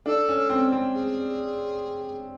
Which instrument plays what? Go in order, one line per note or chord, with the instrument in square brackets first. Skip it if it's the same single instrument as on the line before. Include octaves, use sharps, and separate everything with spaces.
[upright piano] D4 [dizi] A4
[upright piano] C#4
C4
C4
[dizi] G#4